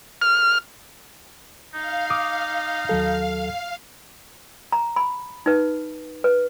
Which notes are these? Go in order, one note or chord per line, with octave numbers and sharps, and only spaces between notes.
F6
D#4 F5
D6 D#6
D#2 F#3 A4
A#5
B5
D#4 B4
B4